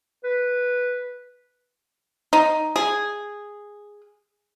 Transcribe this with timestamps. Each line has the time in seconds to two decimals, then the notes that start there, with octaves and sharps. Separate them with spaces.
0.24 B4
2.33 D#4
2.76 G#4